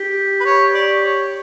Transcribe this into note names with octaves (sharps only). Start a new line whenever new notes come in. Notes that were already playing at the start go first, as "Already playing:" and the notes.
Already playing: G4
B4
C#5
D5
C#5